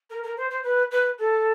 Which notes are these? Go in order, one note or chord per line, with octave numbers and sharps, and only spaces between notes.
A#4
A#4
C5
C5
B4
B4
A4